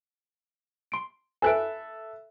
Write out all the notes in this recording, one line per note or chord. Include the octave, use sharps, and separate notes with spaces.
C6 D7
A4 B4 E5 G#5 F#6 D7